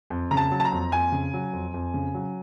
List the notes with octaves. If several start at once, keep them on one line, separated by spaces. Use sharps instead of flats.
F2
C#3 A#5
A5
F#3
A5
A#5
F2
F2 G#5
C#3
F#3
F2
F2
C#3
F#3